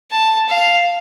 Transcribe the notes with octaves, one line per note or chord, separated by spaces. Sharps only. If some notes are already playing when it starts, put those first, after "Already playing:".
A5
F5